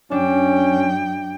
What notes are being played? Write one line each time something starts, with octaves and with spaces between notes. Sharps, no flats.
F#2 C#4 D4 G5